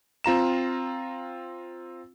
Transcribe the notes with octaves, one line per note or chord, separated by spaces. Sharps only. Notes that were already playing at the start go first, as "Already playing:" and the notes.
C4 F4 A#5 E7